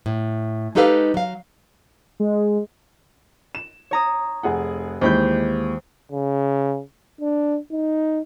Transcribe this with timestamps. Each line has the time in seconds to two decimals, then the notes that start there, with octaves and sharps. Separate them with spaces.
0.06 A2
0.75 G#3 D#4 G4 A4 B4 F5
1.14 F#3 F5
2.20 G#3
3.55 E7
3.91 C#5 A#5 D#6
4.43 F1 G#4 F#5
5.01 D#2 E3 G#3 C5 B5 G6
6.12 C#3
7.21 D4
7.71 D#4